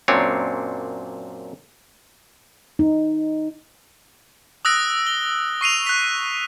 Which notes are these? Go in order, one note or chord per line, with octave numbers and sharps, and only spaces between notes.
F#2 A#2 C4 D4 C#5
D#4
D#6 E6 F#6 A#6 D7
G7
C#6 C7 D#7 F7
F#6 B6